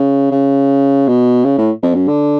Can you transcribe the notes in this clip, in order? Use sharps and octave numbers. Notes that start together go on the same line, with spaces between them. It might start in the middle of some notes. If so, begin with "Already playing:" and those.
Already playing: C#3
C#3
B2
C#3
A2
F2
F#2
D3